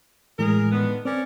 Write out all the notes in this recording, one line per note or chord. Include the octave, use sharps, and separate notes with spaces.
A2 E3 G#3 G#4 A#4
D3 D#3 B3
C4 C#4 A#4 D5